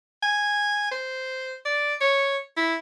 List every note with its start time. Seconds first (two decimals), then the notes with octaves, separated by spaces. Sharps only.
0.23 G#5
0.92 C5
1.66 D5
2.01 C#5
2.57 E4